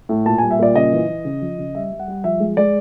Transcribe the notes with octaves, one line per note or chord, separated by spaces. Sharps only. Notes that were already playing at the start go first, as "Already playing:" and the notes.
A2
A#2 A5
G3 G#5
E5
A#2 D5
C#3 D#5
E3
E3
C#3
F3
C#3
G3 E5
G3
F#5
G3
F3 E5
G#3
G#3 D5